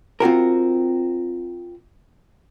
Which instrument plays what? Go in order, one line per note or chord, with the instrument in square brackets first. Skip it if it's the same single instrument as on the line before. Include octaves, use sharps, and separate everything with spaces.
[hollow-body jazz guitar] C4 F4 F#4 A#4